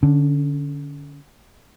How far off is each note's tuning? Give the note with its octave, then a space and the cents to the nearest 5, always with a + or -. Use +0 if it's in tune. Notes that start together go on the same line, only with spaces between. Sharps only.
D3 +0 C#4 +20